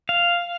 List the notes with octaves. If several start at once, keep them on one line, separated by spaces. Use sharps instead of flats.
F5